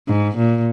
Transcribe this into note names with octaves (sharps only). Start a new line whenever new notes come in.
G#2
A#2